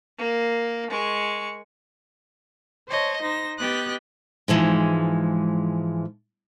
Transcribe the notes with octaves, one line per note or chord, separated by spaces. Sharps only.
A#3
G#3 C#6
C5 C#5 D#5 A5
D#4 C5 A#6
B3 G4 D#5 G5 F#6 A6
G#2 E3 F3 G#3